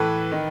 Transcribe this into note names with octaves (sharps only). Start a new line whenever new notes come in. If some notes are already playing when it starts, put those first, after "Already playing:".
Already playing: A2 E3 A4 B4
D#3